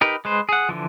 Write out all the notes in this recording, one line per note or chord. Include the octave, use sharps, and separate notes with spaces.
D#4 G4 A#4 B4
G#3 B4 C5
G#4 F#5
D3 E3 F3